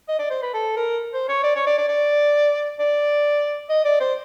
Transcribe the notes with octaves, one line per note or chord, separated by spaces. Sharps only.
D#5
D5
C5
B4
A4
A#4
C5
C#5
D5
C#5
D5
D5
D5
D5
D#5
D5
C5